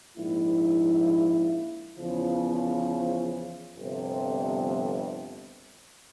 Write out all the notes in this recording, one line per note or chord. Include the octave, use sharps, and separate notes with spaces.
A#1 G#2 F3 A#3 E4
E2 C#3 F3
G1 F2 C3